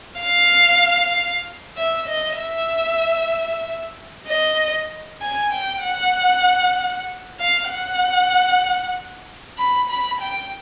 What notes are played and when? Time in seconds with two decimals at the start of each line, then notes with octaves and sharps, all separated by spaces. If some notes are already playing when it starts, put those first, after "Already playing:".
0.20 F5
1.77 E5
2.08 D#5
2.39 E5
4.27 D#5
5.21 G#5
5.52 G5
5.83 F#5
7.40 F5
7.71 F#5
9.58 B5
9.89 B5
10.21 G5